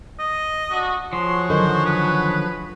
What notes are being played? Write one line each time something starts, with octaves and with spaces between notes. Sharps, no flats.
D#5
D4 F#4
F3 F#4 G#4 C#5 C6
D3 D#3 F#3 C5
B4